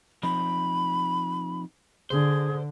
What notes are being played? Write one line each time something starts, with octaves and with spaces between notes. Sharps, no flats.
F3 C4 D#4 B5
D3 G#4 C5